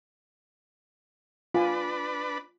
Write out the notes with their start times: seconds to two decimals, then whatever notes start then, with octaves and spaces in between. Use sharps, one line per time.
1.54 D4 F4 B4 G#5